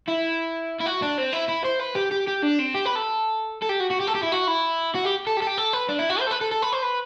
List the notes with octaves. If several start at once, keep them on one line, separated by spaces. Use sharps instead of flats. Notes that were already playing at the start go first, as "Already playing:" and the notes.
E4
E4
F#4
D4
C4
E4
E4
C5
B4
G4
G4
G4
D4
C4
G4
B4
A4
A4
G4
F#4
F#4
G4
A4
G4
E4
F#4
E4
F#4
G4
A4
G4
A4
G4
A4
B4
D4
E4
F#4
C5
A4
B4
A4
A4
B4
C5
B4